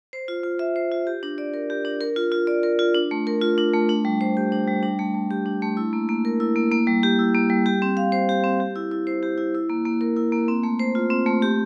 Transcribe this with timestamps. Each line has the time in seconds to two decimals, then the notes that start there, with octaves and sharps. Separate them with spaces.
0.13 C5
0.28 F4
0.43 F4
0.59 E5
0.76 C5
0.92 F4
1.07 G4
1.23 D4
1.38 D5
1.54 A#4
1.70 G4
1.85 D4
2.01 A#4
2.16 F4
2.32 F4
2.47 D5
2.63 A#4
2.79 F4
2.94 D4
3.11 A3
3.27 A#4
3.41 F4
3.58 D4
3.73 A3
3.89 D4
4.05 G3
4.21 C5
4.37 G4
4.52 D4
4.68 G3
4.83 D4
4.99 A3
5.15 A3
5.31 G4
5.46 D4
5.62 A3
5.77 E4
5.93 A#3
6.09 A#3
6.25 A#4
6.40 E4
6.56 A#3
6.72 A#3
6.87 G3
7.03 G4
7.19 E4
7.35 A#3
7.50 G3
7.66 G4
7.82 C4
7.97 F5
8.12 C5
8.29 G4
8.44 C4
8.60 G4
8.76 E4
8.91 E4
9.07 C5
9.23 G4
9.38 E4
9.55 E4
9.69 A#3
9.85 A#3
10.01 A#4
10.16 E4
10.32 A#3
10.48 C4
10.63 A3
10.79 C5
10.95 F4
11.10 C4
11.26 A3
11.42 G4